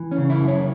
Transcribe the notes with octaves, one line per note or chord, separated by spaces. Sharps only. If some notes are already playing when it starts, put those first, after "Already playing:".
Already playing: E3
C#4
C#3
E4
F#2
C#5